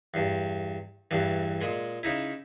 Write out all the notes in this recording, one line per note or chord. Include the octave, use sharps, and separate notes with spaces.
E2 G2
E2 G2 E3
A#2 G#3 C6
C#3 D#4 E4